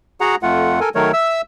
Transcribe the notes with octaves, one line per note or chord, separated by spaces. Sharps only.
F#4 G#4 F#5 A#5
F2 A3 F4 F#5
A4 A#4 G#5
D#3 F#3 A3 A#4 C#5
E5 E6